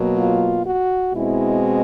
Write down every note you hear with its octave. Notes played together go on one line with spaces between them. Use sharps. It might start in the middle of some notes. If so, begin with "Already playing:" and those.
Already playing: B2 F#3 A#3
F4
F#4
B2 G#3 C4 E4